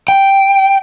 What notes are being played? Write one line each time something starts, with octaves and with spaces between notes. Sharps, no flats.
G5